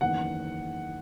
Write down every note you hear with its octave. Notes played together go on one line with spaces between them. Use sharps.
F#1 E2 D#3 F#5